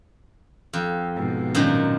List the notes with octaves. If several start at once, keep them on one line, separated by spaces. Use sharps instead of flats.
F2
G#2 B2
F#2 A#2 D#3